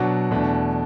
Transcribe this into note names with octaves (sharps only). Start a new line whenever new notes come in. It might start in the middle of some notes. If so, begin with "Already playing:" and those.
Already playing: B2 F#3 D4 F#4 F#5
E2 B2 A3 D4